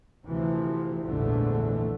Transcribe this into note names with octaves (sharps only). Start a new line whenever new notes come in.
D2 C3 E3 F3
A#1 E2 G#2 D3 E3 A3